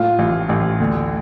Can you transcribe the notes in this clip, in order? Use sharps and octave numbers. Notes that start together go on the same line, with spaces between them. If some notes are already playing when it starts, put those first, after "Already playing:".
Already playing: A2 F4
A1
A1
D2